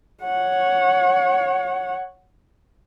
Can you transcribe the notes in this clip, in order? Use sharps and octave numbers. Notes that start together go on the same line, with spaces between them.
C#5 F#5